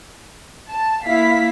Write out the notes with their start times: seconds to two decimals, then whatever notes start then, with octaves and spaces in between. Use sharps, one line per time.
0.70 A5
1.05 A#3 E4 F5 B6